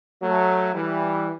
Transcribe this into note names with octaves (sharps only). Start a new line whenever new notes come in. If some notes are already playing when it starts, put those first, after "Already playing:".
F#3 A3
E3 G3